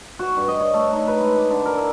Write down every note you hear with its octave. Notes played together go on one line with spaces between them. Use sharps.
F#4
G2
D#5
C#5
A3
D#4
B4
G#3
D6
D3
A#4
E4